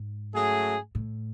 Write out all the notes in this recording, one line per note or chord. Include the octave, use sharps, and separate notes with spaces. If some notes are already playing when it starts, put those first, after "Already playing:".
Already playing: G#2
F#3 A3 C#4 G#4
A2